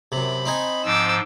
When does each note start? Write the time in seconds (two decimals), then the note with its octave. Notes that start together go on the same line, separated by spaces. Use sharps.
0.12 F#2 C3 B5
0.46 C4 D#4 G#5
0.85 G#2 F3 D6 E6